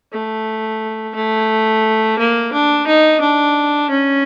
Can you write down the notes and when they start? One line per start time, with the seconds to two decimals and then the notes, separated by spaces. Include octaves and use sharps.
0.12 A3
1.15 A3
2.19 A#3
2.53 D4
2.87 D#4
3.21 D4
3.90 C#4